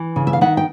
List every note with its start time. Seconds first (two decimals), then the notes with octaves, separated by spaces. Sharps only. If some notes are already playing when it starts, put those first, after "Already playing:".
Already playing: E3
0.16 C#3
0.27 E5
0.33 F5
0.41 D#3 E5 F#5
0.57 G5